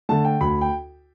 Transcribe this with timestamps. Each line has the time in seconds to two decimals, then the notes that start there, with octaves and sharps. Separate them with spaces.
0.09 D3 A3 A5
0.25 G5
0.41 D2 B5
0.61 G5